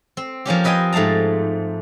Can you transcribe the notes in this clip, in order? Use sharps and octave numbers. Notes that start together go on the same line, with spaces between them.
C4
F3 A#3 C#4 G4
C4 B4 D#5 G5 G#5
G#2 A3 F5 A5 A#5